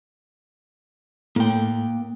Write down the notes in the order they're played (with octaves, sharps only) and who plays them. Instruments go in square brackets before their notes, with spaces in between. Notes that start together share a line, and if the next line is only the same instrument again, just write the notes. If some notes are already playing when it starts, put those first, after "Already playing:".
[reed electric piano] A2 [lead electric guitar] A#3 G5